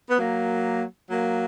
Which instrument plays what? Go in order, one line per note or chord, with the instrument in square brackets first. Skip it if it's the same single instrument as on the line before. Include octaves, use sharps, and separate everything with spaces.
[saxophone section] B3
F#3 A#3
F#3 A#3